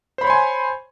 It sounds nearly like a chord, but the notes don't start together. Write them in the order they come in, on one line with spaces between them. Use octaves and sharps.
C5 B5 C#5 C6 G#5